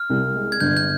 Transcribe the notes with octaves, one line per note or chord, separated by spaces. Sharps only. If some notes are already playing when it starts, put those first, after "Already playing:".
Already playing: F6
C2
G#3
G#6
G1 G6
G6